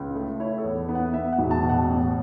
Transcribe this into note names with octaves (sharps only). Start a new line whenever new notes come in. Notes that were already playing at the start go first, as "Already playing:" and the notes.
Already playing: C#2
A3
E4 C#5
A4
E2
B3
F#5
B3 E5
F#5
E1
A5
B2
F#5
A1